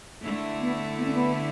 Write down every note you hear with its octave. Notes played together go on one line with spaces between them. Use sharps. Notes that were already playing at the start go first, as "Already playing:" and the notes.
D3 A3 E4
B3
B3
C#4
B3